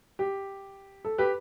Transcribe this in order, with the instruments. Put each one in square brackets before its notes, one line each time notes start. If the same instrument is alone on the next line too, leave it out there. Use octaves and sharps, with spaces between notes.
[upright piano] G4
A4
G4 B4